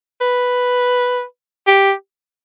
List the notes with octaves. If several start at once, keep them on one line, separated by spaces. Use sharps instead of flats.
B4
G4